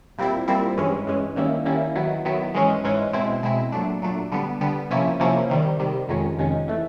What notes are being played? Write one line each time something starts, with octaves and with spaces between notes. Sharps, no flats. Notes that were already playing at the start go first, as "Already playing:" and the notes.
A#2 G3 C4 E4
A#2 G3 C4 E4
G2 E3 G#3 C#4
G2 E3 G#3 C#4
D#3 G3 A#3 C#4 E4
D#3 G3 A#3 C#4 E4
D#3 F#3 B3 E4
D#3 F#3 B3 E4
G#2 E3 G#3 C#4
G#2 E3 G#3 C#4
B2 G#3 C4 E4
B2 G#3 C4 E4
A#2 F#3 A3 D4
A#2 F#3 A3 D4
D3 G3 B3
D3 G3 B3
C3 F3 A#3 C#4 E4
C3 F3 A#3 C#4 E4
C3 D#3 G3
C3 D#3 G3
F2 C3 D#3 G#3 C#4
F2 C3 D#3 G#3 C#4
E3 A3